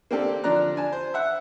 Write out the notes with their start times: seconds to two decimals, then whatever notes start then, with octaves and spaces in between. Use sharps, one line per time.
0.11 A#3 C4 D4 G4 A4
0.44 D3 F3 D4 D5 A#5 F#6
0.76 D4 G#5 A5
0.92 C5
1.14 E5 F#5